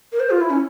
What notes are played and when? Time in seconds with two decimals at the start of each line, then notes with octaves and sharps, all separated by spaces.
0.12 A#4
0.20 C5
0.30 F4
0.41 E4
0.50 C#4